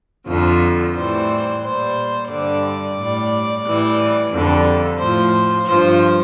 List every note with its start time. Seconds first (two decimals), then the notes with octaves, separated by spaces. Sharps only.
0.26 F2 D3 F3
0.93 A2 E3 G3 C5
1.61 A#2 G3 C5
2.28 G2 D3 G3 D5
2.97 A2 G3
3.64 A2 E3 G3
4.32 F2 D3 G3
4.98 A2 F3 C5
5.66 G2 F3 C5